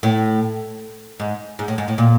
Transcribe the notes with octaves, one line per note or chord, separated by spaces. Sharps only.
A2
G#2
G#2
A2
G#2
A2
A#2